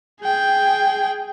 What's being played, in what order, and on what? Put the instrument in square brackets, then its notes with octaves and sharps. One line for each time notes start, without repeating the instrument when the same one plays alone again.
[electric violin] G#4 G5